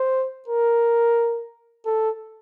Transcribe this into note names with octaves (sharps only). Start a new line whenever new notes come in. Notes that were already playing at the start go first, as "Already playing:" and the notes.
Already playing: C5
A#4
A4